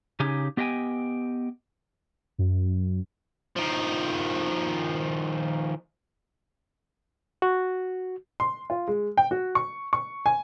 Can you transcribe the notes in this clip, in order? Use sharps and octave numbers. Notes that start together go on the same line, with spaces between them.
C#3 D#4 G4 G#4
B3 G4 D#5 E5 G5 G#5
F#2
D#3 F3
F#4
C6
F4
G#3
G5
F#4
C#6
C#6
G#5